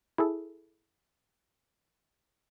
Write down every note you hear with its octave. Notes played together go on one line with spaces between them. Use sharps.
E4 G#4 A4